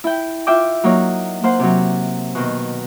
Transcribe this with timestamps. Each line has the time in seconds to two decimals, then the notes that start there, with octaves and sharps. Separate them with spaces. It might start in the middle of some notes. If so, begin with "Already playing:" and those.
0.04 E4 G5
0.47 F4 E5 G5 D6
0.84 F#3 A#3 D#4 C#5
1.43 A#3 C5 F#5
1.59 C3 F#3
2.35 B2 D#3